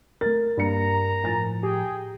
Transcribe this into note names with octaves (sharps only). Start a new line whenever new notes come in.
A3 A#4 A6
G2 A#3 A#5 C#7
A2 F3 G#5 A6
G4 G#4 G5